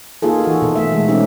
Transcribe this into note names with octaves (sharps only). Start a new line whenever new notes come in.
A#3 D#4 F4 G#4 A4
E3 F#4
B2 A4
A3 E5
E3 G#3
C4 C#4 D#4 G4